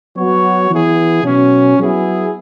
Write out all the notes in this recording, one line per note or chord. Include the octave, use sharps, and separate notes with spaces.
F#3 B3 F#4 C#5
E3 B3 E4 G#4
B2 F#3 C#4
F#3 B3 E4 G#4